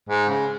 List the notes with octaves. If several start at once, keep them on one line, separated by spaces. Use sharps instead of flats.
G#2
C#3